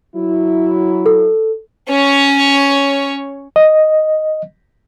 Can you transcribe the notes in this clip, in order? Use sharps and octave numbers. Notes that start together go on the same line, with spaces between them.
F#3 E4
A4
C#4 C#5
D#5